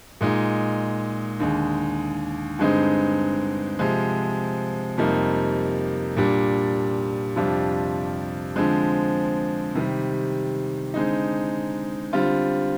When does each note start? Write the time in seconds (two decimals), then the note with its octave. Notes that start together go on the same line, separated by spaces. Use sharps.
0.21 A#2 G#3 D#4
1.40 D#2 D3 G#3
2.59 G2 D3 G#3 C4 D#4
3.79 C3 F3 G#3
4.98 F2 C3 G3 A#3 D#4
6.16 A#2 G3 D4
7.36 F2 C3 G3 D4 F4
8.56 D3 F3 G#3 C4
9.75 C3 D#3 G3
10.94 D3 G#3 C4 D#4
12.13 D3 G3 C4 F4